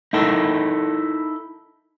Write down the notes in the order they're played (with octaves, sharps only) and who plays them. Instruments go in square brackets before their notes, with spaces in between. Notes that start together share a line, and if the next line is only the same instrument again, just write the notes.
[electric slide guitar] D#4 E4 A4 A#4